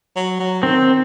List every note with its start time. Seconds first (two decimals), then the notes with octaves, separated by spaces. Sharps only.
0.16 F#3
0.40 F#3
0.62 D#3 C4